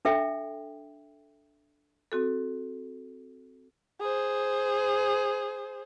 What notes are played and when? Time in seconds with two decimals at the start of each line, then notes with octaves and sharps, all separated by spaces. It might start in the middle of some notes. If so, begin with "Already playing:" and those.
0.05 D4 A4 E5 G5
2.12 C4 F#4 A4
4.01 G#4 C5